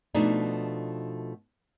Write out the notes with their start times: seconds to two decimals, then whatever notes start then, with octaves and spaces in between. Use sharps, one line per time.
0.15 B2 F3 A3 D4 D#4